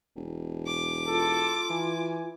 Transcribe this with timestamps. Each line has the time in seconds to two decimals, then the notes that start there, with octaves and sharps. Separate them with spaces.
0.16 E1
0.67 D6
1.08 F4 A4
1.70 E3 G#5